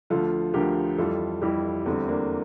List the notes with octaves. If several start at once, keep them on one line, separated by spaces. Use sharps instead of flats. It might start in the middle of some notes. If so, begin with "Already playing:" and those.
D2 D3 F3 F4 A4
D2 D3 F3 G4 A#4
F2 E3 G3 F4 A4
F2 E3 G3 E4 G4
E2 D3 G3 A3 C4
A#3 D4